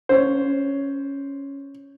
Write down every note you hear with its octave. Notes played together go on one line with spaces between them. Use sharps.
C#4 C5 C#5